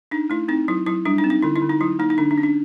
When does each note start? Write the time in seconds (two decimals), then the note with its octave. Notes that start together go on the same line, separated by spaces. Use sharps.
0.11 D4 D#4
0.30 A3 E4
0.48 C4 D#4
0.68 F#3 E4
0.86 F#3 E4
1.05 G3 D4
1.18 D#4
1.24 C4
1.30 D#4
1.42 D3 E4
1.56 E4
1.62 D3
1.70 D#4
1.81 F#3 E4
1.99 A#3 D#4
2.10 D#4
2.18 D3 D4
2.31 D4
2.38 C#4
2.43 D4